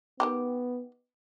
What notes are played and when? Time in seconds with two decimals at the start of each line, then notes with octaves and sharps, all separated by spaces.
0.20 D#3 E3 B3 G4